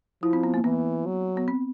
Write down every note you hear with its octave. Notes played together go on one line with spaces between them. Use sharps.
F3 E4
C4
B3
A#3
E3 B3
F#3
B3
C4